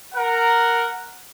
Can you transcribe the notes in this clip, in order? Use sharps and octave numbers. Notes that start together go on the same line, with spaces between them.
A#4 F#5